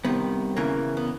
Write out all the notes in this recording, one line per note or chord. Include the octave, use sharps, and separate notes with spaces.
C2 C3 D#3 B3
E2 C#3 E3 A#3
B3